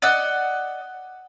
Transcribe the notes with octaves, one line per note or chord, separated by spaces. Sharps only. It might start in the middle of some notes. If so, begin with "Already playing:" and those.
D5 D#5 F#5 E6